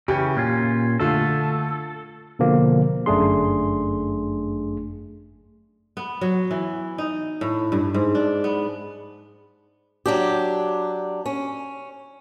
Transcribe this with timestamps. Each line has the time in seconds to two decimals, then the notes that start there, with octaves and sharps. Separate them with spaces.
0.08 C#3 E3 C#4 G4
0.37 A#2 C#4 F4
1.00 D3 A3 F4 A4
2.39 B2 D3 F3 A#3
3.06 G1 F#2 A3 D4 G#4 C6
5.97 B3
6.21 F#3
6.51 E3
6.98 D#4
7.41 A2
7.72 G2
7.94 G#2
8.15 D4
8.44 B3
10.06 F#3 D4 G4
11.26 C#4